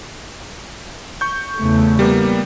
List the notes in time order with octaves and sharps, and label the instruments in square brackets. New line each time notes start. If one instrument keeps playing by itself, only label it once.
[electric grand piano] C#6 G6
[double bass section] E2 C#3 A3
[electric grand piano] G3 A#3 B3